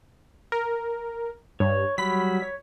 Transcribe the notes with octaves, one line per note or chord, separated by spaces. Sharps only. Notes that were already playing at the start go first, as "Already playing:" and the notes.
A#4
G2 C#5
F#3 G3 B5 B6
C#5